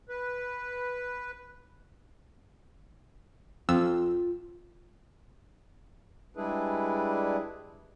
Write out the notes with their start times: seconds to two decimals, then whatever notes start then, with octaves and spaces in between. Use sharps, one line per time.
0.09 B4
3.69 F2 F4 E6
6.36 G3 G#3 D4 E4 G#4 B4